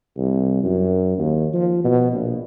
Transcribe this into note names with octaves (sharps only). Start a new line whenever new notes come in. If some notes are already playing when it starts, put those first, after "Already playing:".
C2
F#2
D#2
F3
B2
A#1